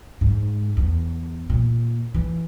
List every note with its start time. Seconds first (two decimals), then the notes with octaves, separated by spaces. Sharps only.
0.21 G#2
0.77 E2
1.50 A#2
2.14 E3